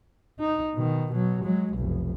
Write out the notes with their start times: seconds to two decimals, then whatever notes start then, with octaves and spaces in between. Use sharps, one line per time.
0.39 D#4
0.76 B2 D#3
1.12 B2 F#3
1.44 F#3 G#3
1.74 F1 B1